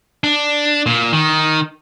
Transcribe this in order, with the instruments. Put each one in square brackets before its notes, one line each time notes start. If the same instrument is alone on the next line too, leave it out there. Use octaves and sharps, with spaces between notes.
[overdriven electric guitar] D4
A#2
D#3